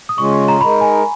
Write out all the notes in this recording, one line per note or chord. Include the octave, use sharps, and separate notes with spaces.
D#6
C#3 G#3 C#4 F4 C#6
A#5
G#3 D#4 A#4 B5
G#5